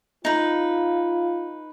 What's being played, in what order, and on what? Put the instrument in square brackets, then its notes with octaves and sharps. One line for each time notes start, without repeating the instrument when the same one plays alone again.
[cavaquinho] D#4 B4 [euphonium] F4